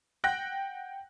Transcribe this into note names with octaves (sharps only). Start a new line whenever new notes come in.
F#5 G5 F#6 A#6